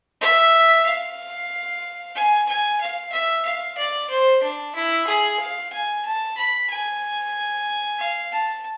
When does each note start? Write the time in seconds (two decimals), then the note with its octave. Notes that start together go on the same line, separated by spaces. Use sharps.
0.21 E5
0.86 F5
2.15 G#5
2.48 G#5
2.81 F5
3.12 E5
3.45 F5
3.77 D5
4.10 C5
4.43 D4
4.75 E4
5.07 G#4
5.39 F5
5.72 G#5
6.05 A5
6.37 B5
6.70 G#5
7.99 F5
8.32 A5